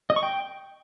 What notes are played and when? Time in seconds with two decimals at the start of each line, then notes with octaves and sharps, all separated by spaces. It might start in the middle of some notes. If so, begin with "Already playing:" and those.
0.10 D#5
0.16 C#6
0.23 G5